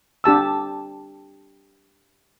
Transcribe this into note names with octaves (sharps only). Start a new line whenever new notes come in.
D4 G4 A5 E6